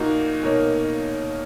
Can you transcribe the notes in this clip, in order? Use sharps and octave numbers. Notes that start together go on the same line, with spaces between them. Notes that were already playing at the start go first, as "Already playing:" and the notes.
Already playing: A#2 A#3 D#4 F#4
B2 A#3 D#4 A#4 C#5